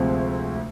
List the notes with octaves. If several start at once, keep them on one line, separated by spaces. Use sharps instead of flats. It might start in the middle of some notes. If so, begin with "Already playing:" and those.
Already playing: D2 C3 F3 G#3 C4